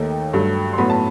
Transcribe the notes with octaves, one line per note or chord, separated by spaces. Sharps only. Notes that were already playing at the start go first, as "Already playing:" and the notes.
Already playing: D#2 D#3 A3 G5
G2 F#3 A3
C6
A2 F#3 B3 B5
A5